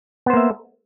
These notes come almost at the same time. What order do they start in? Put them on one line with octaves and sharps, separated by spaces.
B3 C5 A#3 E5